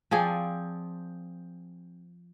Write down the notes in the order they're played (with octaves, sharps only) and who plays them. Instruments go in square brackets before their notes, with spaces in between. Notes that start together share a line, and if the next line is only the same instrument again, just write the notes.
[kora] F3 C4 G#4 D5